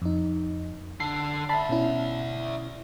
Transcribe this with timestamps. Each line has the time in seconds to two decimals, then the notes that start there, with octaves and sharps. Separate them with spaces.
0.02 F2 D#4
1.00 D3 D4 C7
1.49 D5 E5 A5 B5
1.69 B2 C#4 E4